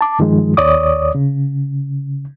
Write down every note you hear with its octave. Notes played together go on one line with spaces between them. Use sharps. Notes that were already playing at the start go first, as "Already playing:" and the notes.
A5 D6
G2 D#3 F3 G#3
D#2 C#5 D5 D6 D#6
C#3